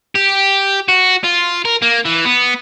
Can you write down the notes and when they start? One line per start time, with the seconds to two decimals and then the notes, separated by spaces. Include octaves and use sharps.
0.15 G4
0.89 F#4
1.24 F4
1.65 A#4
1.82 A#3
2.05 E3
2.25 B3